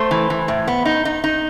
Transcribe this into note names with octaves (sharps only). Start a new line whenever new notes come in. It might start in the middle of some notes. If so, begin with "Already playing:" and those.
Already playing: A3 C5
E3
E3
A2
B3
D#4
D#4
D#4